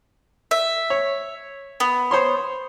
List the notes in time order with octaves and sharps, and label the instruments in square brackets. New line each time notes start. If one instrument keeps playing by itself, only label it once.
[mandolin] E5
[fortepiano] C#5
[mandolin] B3
[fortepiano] C5 C#5 C6